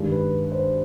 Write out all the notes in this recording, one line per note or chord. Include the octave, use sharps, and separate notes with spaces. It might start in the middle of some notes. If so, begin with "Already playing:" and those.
Already playing: G2 D#3 G#3
B4
C5